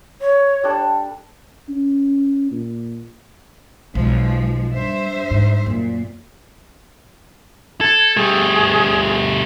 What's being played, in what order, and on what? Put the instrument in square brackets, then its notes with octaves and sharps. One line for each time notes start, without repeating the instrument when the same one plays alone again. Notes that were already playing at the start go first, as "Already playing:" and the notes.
[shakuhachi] C#5
[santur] G3 D4 A4
[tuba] C#4
A#2
[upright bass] B1 [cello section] F3 G#3
[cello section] G2 C5 E5
[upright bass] G#2
[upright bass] F#2 [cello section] A#2
[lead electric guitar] A4 [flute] G#6
[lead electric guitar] G3 A3 [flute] G#4